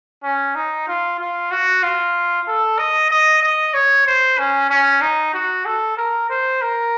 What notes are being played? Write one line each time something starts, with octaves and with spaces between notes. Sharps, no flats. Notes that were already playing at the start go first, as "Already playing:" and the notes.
C#4
D#4
F4
F4
F#4
F4
A4
D#5
D#5
D#5
C#5
C5
C#4
C#4
D#4
F#4
A4
A#4
C5
A#4